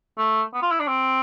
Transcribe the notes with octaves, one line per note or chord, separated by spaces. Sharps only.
A3
B3
F4
E4
D4
C4